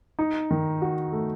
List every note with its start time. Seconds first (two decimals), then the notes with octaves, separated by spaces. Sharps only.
0.19 D#4
0.51 D#3
0.82 F#4
1.12 A3